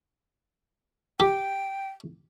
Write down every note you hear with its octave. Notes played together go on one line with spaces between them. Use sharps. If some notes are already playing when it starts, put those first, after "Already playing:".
G4 G5